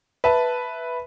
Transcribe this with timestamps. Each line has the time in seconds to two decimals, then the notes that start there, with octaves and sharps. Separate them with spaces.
0.24 B4 E5 A5